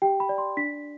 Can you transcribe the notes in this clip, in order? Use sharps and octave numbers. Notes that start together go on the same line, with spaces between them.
G4 G5
B5
D5
C6
D4 B6